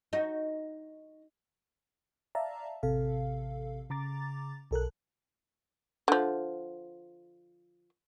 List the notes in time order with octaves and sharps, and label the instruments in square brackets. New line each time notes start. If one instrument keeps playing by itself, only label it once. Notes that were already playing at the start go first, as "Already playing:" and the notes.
[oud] D#4 F#4
[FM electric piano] D5 E5 F5 A5 A#5
A1 C3 A4 F5
C#3 A#5 D6 A6
B1 A4 A#4 F#6
[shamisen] D3 F3